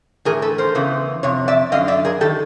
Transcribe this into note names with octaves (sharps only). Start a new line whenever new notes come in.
A2 E3 G#4 A#4
A4 B4
A#4 C5
E2 C#3 E3
F2 C3 C#5
D5 E5
F#2 D3 D#5 F5
D5 E5
G#4 A#4
D#3 G4 A4